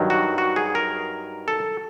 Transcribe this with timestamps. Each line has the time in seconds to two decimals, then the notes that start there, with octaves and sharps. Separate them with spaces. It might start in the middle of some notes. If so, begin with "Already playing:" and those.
Already playing: G2 D#3 F#3
0.10 F#4
0.38 F#4
0.56 G#4
0.75 A#4
1.48 A4